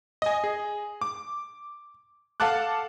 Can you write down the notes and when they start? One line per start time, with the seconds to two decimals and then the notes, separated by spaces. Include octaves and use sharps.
0.22 D#5 G#5
0.44 G#4
1.01 D6
2.40 A4 F5 F#5 A5 D6 F#6